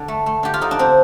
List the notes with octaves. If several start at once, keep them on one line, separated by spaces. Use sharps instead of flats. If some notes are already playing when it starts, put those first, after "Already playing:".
Already playing: D3
A3
A3
D3 G4
F4
D3 D#4
D4
D3 C4